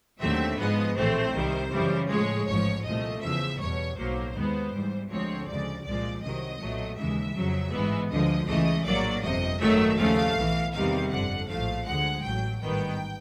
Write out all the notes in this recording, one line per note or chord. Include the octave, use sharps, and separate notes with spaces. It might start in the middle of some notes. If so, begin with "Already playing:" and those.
D#2 D3 F#3 A3 C4 E5
G#2 F3 G#3 B3 D#5
A#1 A2 E3 A3 C4 C5
C2 C3 D#3 G3
F#2 C#3 E3 G3
A2 F3 G#3 C#5
A1 G#2 F3 C#5
C2 A#2 F3 A3 D#5
E2 C#3 F3 E5
E2 B2 G3 C#5
B1 A2 F#3 A#3 C5
D#2 D#3 G#3 B3
G#2 E3 G3
D2 D3 F3 G#3 C4 C#5
D2 C#3 F3 G#3 D5
C2 A#2 F3 G#3 D5
C2 C3 D#3 F#3 D#5
B1 A#2 F#3 A3
D#2 C#3 E3 G#3 E5
F2 C#3 F#3
A1 G#2 E3 G#3 B3
D2 D3 F3 G#3 D#5
C#2 C#3 E3 A3 D#5
A#1 A2 F#3 A#3 D5
G1 F2 C3 D#5
G#1 F#2 D#3 F#3 A3 E5
D#2 C#3 F3 A3 F5
B1 A2 E3
E2 C3 D#3 G3 F5
G1 F2 D3 F#5
A#1 A2 F3 A3 F5
D2 D3 F3 G#3 F#5
A1 A2 F#3 G5
A1 G#2 D#3 G3 B3 G5